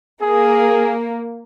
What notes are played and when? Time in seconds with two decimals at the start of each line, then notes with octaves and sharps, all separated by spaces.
0.22 A#3 G#4